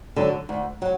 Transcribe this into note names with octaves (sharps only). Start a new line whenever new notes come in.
D3 F#3
D2
F#3